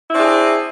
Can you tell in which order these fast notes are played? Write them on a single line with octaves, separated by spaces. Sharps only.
E4 C4 D4 G#4